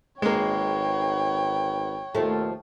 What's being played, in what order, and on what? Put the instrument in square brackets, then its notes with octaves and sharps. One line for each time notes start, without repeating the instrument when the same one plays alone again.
[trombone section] G#1 D#4 B4 [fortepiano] G#3 A#3 [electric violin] C#5 G5
[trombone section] D#2 B2 D#3 [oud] F3 A3